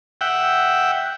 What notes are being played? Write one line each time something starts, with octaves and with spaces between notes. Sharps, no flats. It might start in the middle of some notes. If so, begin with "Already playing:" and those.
E5 F#5 G5